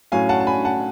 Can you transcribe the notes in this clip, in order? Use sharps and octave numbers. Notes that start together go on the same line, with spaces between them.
A2 F#3 C#4 F5 G#5
F#5 A5
A5
G#5 B5
F#5 A5